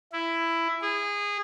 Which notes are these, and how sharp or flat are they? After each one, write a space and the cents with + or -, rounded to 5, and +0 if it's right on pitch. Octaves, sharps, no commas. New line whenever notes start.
E4 +10
G#4 -20